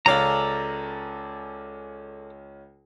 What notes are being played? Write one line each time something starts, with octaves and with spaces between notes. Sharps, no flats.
C#2 C#4 A4 D5 F5 A#5